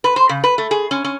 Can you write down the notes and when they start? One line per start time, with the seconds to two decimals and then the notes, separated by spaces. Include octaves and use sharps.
0.04 B4
0.16 C5
0.29 C#3
0.44 B4
0.58 A3
0.71 G#4
0.91 C#4
1.04 C#4